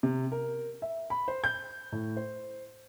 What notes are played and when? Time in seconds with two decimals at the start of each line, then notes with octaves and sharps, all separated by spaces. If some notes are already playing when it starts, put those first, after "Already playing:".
0.03 C3
0.32 A#4
0.82 E5
1.10 B5
1.28 C5
1.44 G6
1.92 A2
2.17 C5